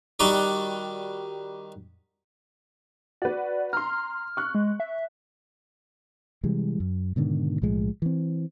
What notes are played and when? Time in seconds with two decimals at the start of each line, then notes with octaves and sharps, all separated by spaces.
0.20 D#3 G3 D#4 F#4 D5
3.22 F#4 B4 D5
3.73 A#5 C6 F6
4.37 C#6 F#6
4.55 G#3
4.80 E5
6.44 C3 E3 G3 G#3
6.80 F#2
7.16 G#2 B2 D3 D#3
7.62 B1 A2 F3 G#3
8.02 E3 C4